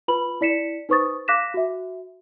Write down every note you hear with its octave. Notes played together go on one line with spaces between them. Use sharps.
F4 B4 B5 F#7
E4 D5 B6 C#7 E7
D#4 B4 C5 C#6 D#6 A6
F5 D6 F#6 A#6 B6 E7
F#4 E5